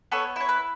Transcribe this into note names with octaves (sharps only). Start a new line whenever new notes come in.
B3 A4 C#5
E4 C#5
B4